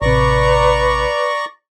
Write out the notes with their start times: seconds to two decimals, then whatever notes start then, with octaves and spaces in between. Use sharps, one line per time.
0.02 A1 C3 B4 D5 A#5 C#6